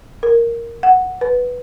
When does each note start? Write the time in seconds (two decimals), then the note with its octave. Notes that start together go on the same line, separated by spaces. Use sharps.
0.23 A#4
0.83 F#5
1.21 B4